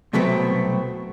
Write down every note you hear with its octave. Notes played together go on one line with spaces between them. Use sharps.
C2 B2 F#3 A3 B3 C4